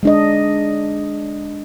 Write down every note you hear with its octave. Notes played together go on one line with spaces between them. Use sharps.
G#3 D4 D#5